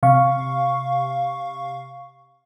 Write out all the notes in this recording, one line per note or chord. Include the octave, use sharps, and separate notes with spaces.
C3 F5 C#6